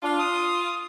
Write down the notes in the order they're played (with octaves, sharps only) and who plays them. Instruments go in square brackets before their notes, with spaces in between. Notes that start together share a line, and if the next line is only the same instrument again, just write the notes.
[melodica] D4 [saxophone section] F4
[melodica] D#6